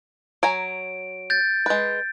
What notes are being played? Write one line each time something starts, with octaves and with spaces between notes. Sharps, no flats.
F#3 G#5 A#5 D7
G6 A6
G#3 B4